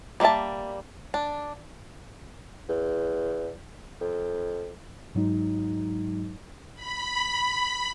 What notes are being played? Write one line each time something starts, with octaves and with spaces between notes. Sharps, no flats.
G3 A#3 F4 E5 A5
D4
E2
F2
G#2 F#3 G#3 D#4
B5